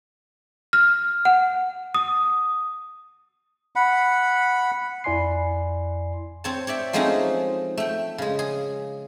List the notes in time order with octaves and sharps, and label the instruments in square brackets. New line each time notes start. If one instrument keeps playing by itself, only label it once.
[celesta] F6
F#5
D#6
[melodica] F#5 B5
[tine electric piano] F2 E4 D5 G#5 C6 C7
[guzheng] C4 C#5 A5
C#5 D5 E5 G5
F3 G#3 A3 C4 C#4 D#4
A3 G5
C#3 G#3
G#4